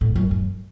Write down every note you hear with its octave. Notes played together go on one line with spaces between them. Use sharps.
A2
F#2
F#2